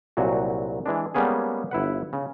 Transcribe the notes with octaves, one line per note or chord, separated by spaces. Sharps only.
C2 A#2 F#3 F#4
E3 G#3 D4
G3 G#3 A#3 B3 C#4 G#4
G1 E4 B4 F#5
C#3